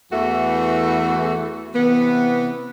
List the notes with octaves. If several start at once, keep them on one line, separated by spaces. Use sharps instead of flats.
E2 E3 A3 F#4 A4
C3 E3 B3